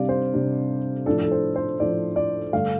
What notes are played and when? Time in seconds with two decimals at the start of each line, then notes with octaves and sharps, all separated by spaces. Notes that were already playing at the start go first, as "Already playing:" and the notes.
Already playing: C3 G3 D4 D5 F5
0.09 C5
0.34 C3 G3 D4
1.06 A2 F3 D4 A4
1.22 A4
1.31 C5
1.56 C5
1.80 A2 F3 D4 D5
2.16 D5
2.53 G2 D3 A3 F5